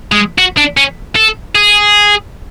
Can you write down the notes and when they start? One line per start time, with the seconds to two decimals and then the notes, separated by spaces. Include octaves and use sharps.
0.12 G#3
0.38 F#4
0.57 D4
0.77 C#4
1.16 A4
1.55 G#4